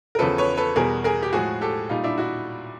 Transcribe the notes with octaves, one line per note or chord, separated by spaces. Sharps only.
A#4
E2 C#3 F3 A4 B4
B4 C#5
A4 B4
E2 B2 G3 G#4 A#4
G#4 A#4
G4
A2 F3 G#3 F#4 G#4
G4 A4
A#2 G3 D#4 F4
D4 E4
E4 F#4